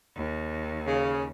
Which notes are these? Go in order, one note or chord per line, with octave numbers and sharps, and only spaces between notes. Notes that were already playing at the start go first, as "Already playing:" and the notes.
D#2
C#3